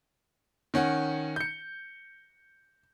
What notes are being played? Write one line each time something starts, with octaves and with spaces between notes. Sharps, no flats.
D#3 C#4 F#5
G6 C#7